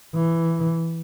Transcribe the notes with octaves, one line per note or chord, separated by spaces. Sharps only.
E3